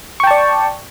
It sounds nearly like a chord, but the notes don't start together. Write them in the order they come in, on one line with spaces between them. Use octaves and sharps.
C#6 G5 A5 D5